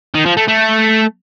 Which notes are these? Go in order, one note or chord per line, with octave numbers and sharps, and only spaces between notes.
D#3
F3
A3
A3